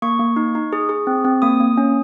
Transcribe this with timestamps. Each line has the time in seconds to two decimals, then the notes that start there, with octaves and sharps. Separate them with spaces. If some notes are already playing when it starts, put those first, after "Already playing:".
0.02 A#3 C#6
0.20 A#3
0.36 D#4
0.55 D#4
0.73 G#4
0.89 G#4
1.07 C4
1.25 C4
1.42 A#3 D#6
1.60 A#3
1.77 C#4